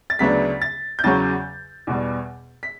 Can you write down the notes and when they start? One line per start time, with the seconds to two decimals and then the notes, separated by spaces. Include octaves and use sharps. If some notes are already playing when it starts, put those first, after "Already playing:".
0.10 A6
0.19 D2 C#3 F#3 B3 D4 B6
0.62 A6
0.99 G6
1.04 E2 C#3 F#3 C#4 A6
1.87 E2 B2 G3
2.63 B6